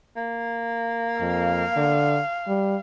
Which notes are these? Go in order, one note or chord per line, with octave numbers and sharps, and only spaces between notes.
A#3
F2 F5
D3
G3